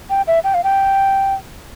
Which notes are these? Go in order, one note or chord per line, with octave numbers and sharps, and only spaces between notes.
G5
E5
G5
F5
G5